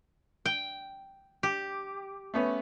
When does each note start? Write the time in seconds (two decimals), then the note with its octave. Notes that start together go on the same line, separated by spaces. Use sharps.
0.45 G5
1.43 G4
2.34 A3 B3 C#4